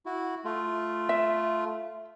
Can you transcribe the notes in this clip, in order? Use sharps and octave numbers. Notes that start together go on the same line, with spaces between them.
E4 F#4
A3 F4
E5